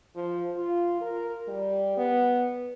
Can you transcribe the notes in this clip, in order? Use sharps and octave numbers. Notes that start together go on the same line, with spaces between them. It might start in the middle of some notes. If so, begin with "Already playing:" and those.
F3
F4
A#4
G3
B3